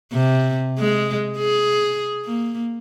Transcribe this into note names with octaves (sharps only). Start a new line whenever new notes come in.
C3
G#3
G#4
A#3